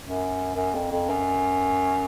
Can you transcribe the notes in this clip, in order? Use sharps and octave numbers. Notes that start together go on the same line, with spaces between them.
F#2
F#2
F2
F2
F#2